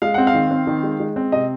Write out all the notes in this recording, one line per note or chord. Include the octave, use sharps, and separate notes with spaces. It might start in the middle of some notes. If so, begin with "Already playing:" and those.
G#3 F5
C4 F#5
F5
D#3
C4
D#3
G#3
G#3
C4
C3 D#5